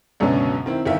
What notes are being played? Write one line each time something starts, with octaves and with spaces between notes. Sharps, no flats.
C#2 F#2 B2 D3 B3 C#4
D#3 C4 E4
G1 D#3 E3 E5 F5